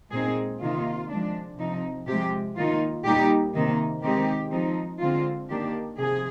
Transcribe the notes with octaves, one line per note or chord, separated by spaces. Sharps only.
A#2 G#3 C4 D#4 G#4
C3 D#3 A#3 D#4 F4
F3 G#3 D4
C3 F3 C4 D#4
C3 F3 G#3 G4
D#3 A#3 D#4 F4
A#2 G3 A#3 D#4 G4
C3 D#3 A#3 D#4
D#3 G#3 C4 D#4 G4
F3 C4 D#4
D3 G#3 C4 F4
D#3 A#3 D4 G4
C3 F3 G#4